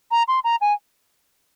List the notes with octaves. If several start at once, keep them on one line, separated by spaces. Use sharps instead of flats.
A#5
C6
A#5
G#5